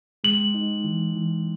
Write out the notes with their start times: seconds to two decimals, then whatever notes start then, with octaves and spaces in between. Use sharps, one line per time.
0.24 G#3 F#7
0.54 D#4
0.84 E3
1.15 E3